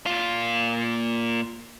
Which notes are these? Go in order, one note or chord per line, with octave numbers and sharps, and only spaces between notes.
A#2 F4